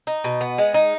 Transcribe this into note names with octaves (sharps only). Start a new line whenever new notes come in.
D#4
B2
B3
G#3
D#4